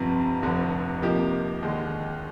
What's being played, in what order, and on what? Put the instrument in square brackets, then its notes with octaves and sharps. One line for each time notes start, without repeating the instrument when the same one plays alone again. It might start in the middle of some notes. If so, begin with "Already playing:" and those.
Already playing: [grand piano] G1 F2 C3
F1 F2 D3
C3 F3 A#3 D#4 G4
D#2 D3 G#3